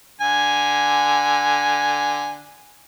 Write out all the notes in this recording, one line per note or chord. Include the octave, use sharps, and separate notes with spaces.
D3 G#5